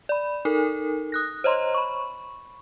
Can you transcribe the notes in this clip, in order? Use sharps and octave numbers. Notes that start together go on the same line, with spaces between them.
D5 B5
D#4 A4 A#4
D#6 F#6 A#6
C5 C#5 D#5 A#5 C6
B5 C#6